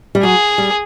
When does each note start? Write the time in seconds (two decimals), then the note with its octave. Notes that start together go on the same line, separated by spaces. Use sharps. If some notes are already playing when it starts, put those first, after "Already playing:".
0.15 G3
0.23 F#3 G#4
0.58 G3